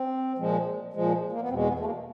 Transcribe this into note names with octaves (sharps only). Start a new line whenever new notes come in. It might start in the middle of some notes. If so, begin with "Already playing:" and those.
Already playing: C4
A#2 F3 G#3
A#2 F3 G#3
A#3
B3
E2 B2 G#3 C4
B3
A3
A#3